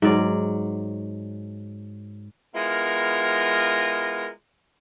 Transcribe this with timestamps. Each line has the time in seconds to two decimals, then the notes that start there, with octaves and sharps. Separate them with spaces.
0.02 G#2 F#3 D5
2.55 G#3 B3 E4 F4 A#4